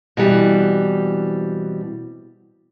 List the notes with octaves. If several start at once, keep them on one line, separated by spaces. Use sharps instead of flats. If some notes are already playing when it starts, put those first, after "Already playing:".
B2 E3 G3 C4